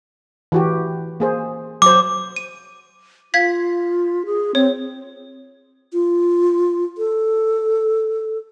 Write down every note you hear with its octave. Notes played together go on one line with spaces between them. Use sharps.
E3 F#4 G4
A#3 G#4 C5
F#3 C5 D6
D#7
F4 F5 G#6 B6
G#4
C4 C#5
F4
A4